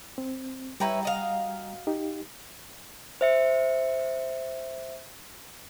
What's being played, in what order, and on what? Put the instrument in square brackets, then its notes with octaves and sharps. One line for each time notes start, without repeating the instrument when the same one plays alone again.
[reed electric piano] C4
[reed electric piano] G3 G5 A#5 [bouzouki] E4 B4 C#5
[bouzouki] F#4 D#5 F5
[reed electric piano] D#4 G4
[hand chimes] C5 E5 C#7